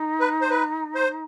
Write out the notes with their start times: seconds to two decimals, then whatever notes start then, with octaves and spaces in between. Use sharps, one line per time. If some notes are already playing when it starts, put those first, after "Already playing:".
Already playing: D#4
0.20 B4
0.41 C5
0.50 B4
0.95 C5